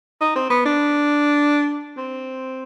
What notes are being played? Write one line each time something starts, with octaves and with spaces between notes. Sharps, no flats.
D#4
C4
B3
D4
C4